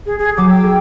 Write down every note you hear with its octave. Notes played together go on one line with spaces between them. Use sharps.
G#4
G#4
F#3 D6
G5 E6
G#4